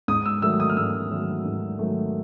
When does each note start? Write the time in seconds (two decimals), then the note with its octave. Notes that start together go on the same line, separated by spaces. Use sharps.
0.08 G#2 D#6
0.26 E6
0.42 D#3 F#3 A3 E6
0.60 D#6
0.70 F6
0.77 G#2 E6
1.10 D#3 F#3 A3
1.45 G#2
1.79 D#3 F#3 A3